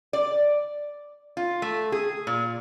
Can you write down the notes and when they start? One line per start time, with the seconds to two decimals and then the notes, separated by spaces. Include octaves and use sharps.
0.13 D5
1.37 F4
1.62 A3
1.92 G#4
2.27 A#2